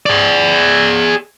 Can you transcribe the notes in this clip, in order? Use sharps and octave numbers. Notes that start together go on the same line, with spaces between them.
G#4 D5